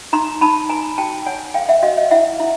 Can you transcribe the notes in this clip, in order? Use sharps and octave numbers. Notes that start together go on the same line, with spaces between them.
D#4 A#5 C6
D#4 A5 B5
B4 G#5 A#5
F#4 G5 A5
C#5 F#5 G#5
A4 F5 G5
E5 F#5
F#4 D#5 F5
D#5 F5
E4 E5 F#5
E4